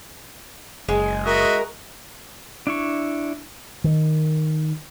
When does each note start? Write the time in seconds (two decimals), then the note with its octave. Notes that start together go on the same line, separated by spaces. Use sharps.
0.89 F#1 G#3
1.25 F#4 A#4 D#5 E5
2.67 D4 E4 C#6
3.84 D#3